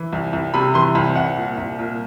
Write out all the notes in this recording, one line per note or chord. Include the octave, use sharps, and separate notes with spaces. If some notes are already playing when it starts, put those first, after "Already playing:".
Already playing: E3
C2
C2
C3 B5
E3 C6
C2 B5
C2 F#5
A#2
C2
A#2